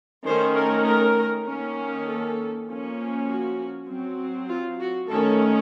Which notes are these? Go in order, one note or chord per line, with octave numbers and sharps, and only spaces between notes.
D#3 A3 C#4 C5
A#4
A#4
D#3 A#3 C#4
A4
F3 A#3 C#4
F#4
F#3 C4
F4
F#4
D#3 A3 C#4 A4